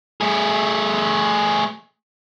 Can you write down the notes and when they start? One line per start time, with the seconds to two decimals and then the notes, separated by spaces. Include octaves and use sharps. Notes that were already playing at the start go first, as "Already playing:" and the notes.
0.21 A3 G#4